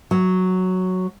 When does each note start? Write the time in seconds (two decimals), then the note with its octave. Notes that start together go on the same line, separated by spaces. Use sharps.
0.11 F#3